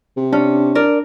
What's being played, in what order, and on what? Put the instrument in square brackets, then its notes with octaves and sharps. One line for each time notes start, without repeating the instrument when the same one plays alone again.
[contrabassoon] C3
[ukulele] C#4 [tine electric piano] D4
[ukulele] A#4 D5